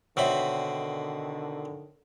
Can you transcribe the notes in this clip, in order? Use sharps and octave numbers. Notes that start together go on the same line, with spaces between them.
B2 D3 D#3 C4 C#5 D5 E5 B5